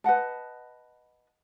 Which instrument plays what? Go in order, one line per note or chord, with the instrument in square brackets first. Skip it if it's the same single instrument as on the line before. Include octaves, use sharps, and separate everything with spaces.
[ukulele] B4 D#5 F#5 A5